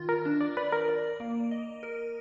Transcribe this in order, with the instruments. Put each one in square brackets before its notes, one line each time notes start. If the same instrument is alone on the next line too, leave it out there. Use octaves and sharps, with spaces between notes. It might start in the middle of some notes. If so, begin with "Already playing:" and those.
Already playing: [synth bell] D#3 F4
[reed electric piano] A#4
[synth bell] D4
[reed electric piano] D5
[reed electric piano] B4 [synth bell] D5
[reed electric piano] A#4
[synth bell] D5
A#3
D#5
A#4